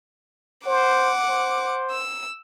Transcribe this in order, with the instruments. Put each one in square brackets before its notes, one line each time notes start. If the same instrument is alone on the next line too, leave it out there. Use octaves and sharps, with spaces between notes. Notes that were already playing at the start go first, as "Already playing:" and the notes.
[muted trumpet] C5 [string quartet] F#5 D6
[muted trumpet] C5
[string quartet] E6